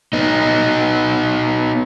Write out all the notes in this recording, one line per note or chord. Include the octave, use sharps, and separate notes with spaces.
B3 D#4